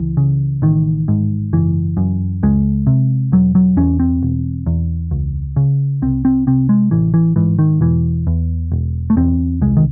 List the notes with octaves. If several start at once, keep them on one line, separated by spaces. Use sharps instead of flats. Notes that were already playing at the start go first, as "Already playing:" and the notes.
Already playing: C#2 E3
C#3
A1 D#3
G#2
F#1 E3
F#2
C#2 G#3
C3
E1 F#3
F#3
E2 C#4
C4
E1
E2
C#2
C#3
C2 C4
C4
C3 C4
G#3
A1 E3
E3
G#2 E3
D#3
E1 E3
E2
E1
A3
E2 C4
C2 G#3
D#3